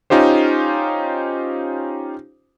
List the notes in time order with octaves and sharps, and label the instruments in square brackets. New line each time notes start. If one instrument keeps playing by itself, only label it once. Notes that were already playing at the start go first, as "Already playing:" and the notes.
[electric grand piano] C#4 D#4 F4 G4 C5